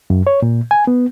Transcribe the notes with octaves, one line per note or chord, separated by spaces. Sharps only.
F#2
C#5
A#2
G#5
B3